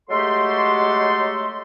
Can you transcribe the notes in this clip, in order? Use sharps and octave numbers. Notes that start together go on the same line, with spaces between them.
F#3 G#3 A3 G4 A4 C6